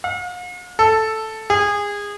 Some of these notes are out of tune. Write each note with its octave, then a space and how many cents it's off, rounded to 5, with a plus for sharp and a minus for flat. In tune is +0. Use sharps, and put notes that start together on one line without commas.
F5 +45
A4 +0
G#4 -25